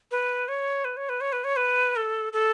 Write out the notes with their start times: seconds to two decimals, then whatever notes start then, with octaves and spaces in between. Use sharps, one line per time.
0.11 B4
0.48 C#5
0.85 B4
0.97 C#5
1.09 B4
1.21 C#5
1.32 B4
1.44 C#5
1.56 B4
1.96 A4
2.33 A4